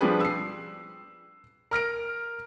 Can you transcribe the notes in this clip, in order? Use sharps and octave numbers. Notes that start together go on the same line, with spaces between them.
F3 G3 D4 G4 G#4 B4
E6 C7
A#4 F6 A#6 D7